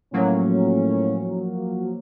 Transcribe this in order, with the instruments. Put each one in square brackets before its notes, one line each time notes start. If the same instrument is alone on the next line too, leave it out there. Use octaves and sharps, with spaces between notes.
[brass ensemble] A2 C#4 [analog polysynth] F3 F#3 A#3